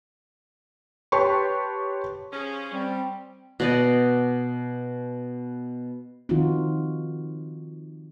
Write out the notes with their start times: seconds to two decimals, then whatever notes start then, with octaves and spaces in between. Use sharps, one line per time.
1.12 G4 B4 C#5 A5 C6 C#6
2.33 F3 C#4 G#4
2.72 G3 C4
3.60 B2 D5 D#5
6.29 D#3 F3 C4 D#4 F4 F#4